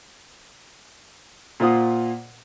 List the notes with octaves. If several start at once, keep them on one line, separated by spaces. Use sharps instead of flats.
A#2 A#3 F4 C5 F#5 D#6